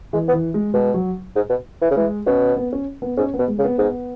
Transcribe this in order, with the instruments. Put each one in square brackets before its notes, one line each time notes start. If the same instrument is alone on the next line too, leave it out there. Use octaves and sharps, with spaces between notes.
[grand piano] E3 [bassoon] G#3
[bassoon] B3
[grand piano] E3
G#3
[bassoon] B2 [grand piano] G#3
[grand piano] F#3
[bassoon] G#2
B2
E3
C#3
[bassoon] E3 [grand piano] G#3
[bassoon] B2 [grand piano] C#4
[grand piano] B3
C#4
B3
[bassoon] G#2 [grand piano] C#4
[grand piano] B3
[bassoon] B2
[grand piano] G#3
[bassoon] C#3
[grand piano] B3
[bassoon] G#2 [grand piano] B3